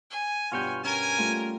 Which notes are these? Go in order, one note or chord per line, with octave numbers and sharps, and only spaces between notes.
G#5
G2 B2 F4 C#5 G5
C#4 A#4 G#5
G3 A3 F4